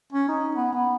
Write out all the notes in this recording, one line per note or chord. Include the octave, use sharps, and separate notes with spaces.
C#4
D#4
B3
B3